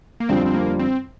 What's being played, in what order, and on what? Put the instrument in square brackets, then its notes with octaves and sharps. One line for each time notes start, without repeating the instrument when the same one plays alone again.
[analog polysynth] A#3
[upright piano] F2 D3 G3 D4 F4 [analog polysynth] C4
[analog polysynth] C4
A#3
C4